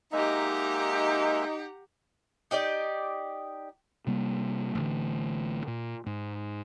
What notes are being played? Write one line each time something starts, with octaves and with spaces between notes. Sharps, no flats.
G#3 A#3 D#4 G4 E5 F#5 A#5
D#4 G4 D5 D#5
C3 G3 A#3
A1 D3
A#2
G#2